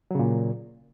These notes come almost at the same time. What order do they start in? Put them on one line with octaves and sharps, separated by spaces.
F#3 C#3 A#2